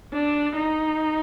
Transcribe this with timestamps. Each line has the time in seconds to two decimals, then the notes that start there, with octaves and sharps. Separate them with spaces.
0.13 D4
0.57 D#4